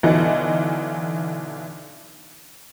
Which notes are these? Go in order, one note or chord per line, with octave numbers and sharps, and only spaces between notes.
B1 D3 E3 D#4